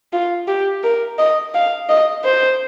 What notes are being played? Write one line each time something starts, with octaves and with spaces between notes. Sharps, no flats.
F4
G4
A#4
D#5
F5
D#5
C5